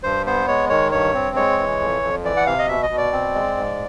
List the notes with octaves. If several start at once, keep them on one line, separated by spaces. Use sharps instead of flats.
G2 C5
B3 C5
G#3 C#5
D#3 C#5
G2 C#5
C4
G#3 C#5
E3
F2
F2
E3 D5
F#5
C3 F5
D#5
B2 E5
D#5
B2
D5
C4
G#3
G#2